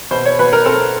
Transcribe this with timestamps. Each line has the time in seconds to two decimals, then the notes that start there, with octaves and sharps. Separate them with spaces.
0.11 B2 C5
0.25 C#5
0.39 B2 B4
0.53 A#4
0.65 C4 A4